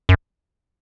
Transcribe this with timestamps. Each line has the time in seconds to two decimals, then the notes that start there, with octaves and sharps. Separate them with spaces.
0.09 F#2